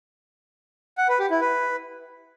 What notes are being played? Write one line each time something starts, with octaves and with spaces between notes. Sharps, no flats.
F#5
B4
G4
E4
B4